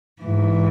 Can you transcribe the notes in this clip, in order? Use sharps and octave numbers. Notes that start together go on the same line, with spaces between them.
G#2 E3